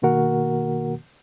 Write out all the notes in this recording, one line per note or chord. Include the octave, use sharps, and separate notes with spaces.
B2 D#3 A#3 F#4 A#4 F#5